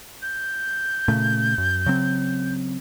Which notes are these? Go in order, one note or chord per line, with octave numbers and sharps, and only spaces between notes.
G6
A#2 C#3 A3
F#2
C#3 F#3 C4